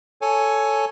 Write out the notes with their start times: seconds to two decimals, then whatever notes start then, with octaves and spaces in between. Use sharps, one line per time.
0.22 A4 C#5 G#5